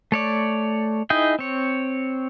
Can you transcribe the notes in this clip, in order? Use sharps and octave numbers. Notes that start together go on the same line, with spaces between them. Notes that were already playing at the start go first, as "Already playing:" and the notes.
A3 C#5 D5
D#4 E4 G#4 D#5 G5
C4 C#5